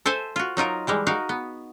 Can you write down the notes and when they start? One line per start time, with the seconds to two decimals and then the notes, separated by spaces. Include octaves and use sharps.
0.06 A4 C5 E5 G#5 A5
0.36 F4 F#4
0.57 F#3 D#4 F4 A#4
0.87 E3 G3 G#3
1.07 D#4 F#4 A#4 F5
1.29 B3